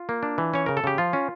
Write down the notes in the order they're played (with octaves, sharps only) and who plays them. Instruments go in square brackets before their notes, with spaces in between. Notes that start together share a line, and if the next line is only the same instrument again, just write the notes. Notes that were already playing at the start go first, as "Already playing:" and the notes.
Already playing: [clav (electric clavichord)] F4
A#3
D4
E3
C#4 C#5
C#3 A#4
A4
C#3 G4
F3 F4
C#4